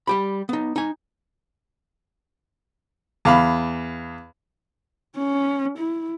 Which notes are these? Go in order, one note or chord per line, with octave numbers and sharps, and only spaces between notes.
G3 G4 B5
B3 D#4
D#4 G#5
E2 F5 B5
C#4
E4